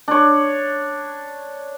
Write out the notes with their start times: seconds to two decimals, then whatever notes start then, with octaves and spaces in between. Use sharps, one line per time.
0.08 D4 C#5